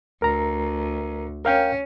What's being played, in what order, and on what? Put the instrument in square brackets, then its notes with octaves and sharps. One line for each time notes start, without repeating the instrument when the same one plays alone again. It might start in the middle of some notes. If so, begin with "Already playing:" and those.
[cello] D2 [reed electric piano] A#4 A#5
[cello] C#4 [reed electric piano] A#4 F5 G5